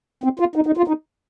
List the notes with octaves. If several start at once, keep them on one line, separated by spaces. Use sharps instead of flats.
C4
F4
D#4
D#4
F4
D#4